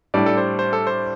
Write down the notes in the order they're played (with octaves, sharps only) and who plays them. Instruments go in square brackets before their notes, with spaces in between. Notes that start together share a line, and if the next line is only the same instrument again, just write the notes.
[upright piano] A2 G3 D4 [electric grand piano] D5
[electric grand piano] A4
C5
C5
A4
C5